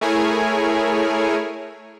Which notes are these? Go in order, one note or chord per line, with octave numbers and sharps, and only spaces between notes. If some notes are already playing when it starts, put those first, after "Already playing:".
A3 E4 G#4 A#4 C#5 G#5